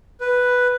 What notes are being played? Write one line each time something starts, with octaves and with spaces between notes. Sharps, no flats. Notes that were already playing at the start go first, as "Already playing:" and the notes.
B4